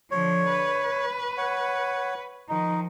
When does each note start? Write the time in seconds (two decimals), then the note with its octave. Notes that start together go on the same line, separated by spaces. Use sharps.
0.11 D3 F3 C#5
0.49 B4
1.38 C#5 F#5
2.49 D#3 F3 D#4